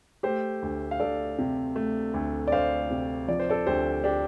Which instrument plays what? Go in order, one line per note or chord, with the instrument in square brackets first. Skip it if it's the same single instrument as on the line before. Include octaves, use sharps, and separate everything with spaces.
[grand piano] A3 G4 C5
D2
F5
D2 A4 D5
C3
A3
D2
D5
D2 C5 F5
C3
F3 D5
C5
A4 D5
D2 G4 C5
D4 G4